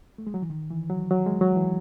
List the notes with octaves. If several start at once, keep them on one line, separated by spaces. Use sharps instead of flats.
A3
G#3
F#3
E3
D#3
E3
F#3
F#3
G#3
F#3
E3